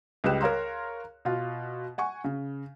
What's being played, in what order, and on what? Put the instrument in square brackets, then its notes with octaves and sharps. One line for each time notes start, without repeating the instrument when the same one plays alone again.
[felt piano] C#2 G3 B4 G5 F#6 E7
A#4 C#5 F5 A#5 C6
B2 F4
F#5 G#5 C#6
C#3